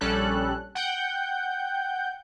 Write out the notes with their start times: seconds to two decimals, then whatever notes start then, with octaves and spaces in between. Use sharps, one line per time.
0.01 A#1 G3 C#4 A4 F#6
0.75 F#5 G5 G6